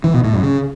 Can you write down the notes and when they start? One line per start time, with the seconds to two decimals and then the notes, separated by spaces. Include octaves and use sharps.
0.04 E3
0.14 B2
0.24 A2
0.33 F#2
0.43 C#3